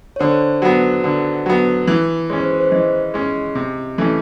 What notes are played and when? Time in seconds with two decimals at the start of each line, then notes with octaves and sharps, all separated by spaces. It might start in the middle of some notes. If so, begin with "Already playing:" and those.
0.16 C#5
0.20 D3 C5
0.62 F#3 B3
1.04 D3
1.46 F#3 B3
1.87 E3 B4
2.30 G#3 C#4 C#5
2.40 C5
2.51 B4
2.61 C5
2.72 E3 D#5
3.14 G#3 C#4
3.55 C3
3.98 E3 A3 C#4